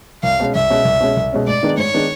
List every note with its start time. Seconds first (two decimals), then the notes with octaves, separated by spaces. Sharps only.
0.23 C2 F5
0.40 B2 G#3 C#4
0.55 C2 E5
0.70 B2 G#3 C#4
0.85 C2
1.01 B2 G#3 C#4
1.16 C2
1.32 B2 G#3 C#4
1.47 G#2 D5
1.63 D#3 G#3 B3 D4
1.77 G#2 C#5
1.94 D#3 G#3 B3 D4